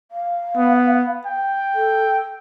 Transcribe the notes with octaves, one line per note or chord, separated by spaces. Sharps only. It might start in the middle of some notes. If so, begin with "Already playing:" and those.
F5
B3
G5
A4